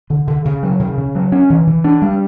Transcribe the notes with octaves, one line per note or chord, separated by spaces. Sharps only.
D3
D3
C#3
F#3
C#3
C#3
F#3
C#4
E3
E3
D4
G3